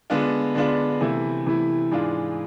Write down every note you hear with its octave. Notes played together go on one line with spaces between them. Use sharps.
D3 G#3 B3 D4 F4
D3 G#3 B3 D4 F4
C3 E3 A3 E4
C3 E3 A3 E4
G#2 E3 G#3 D4 F4